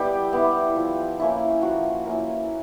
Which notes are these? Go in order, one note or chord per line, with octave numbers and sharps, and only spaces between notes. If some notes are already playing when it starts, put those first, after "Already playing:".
Already playing: G3 B3 E4 G4
B3 E4
F3
A#3 C#4 E4
F3 F#4
A#3 C#4 E4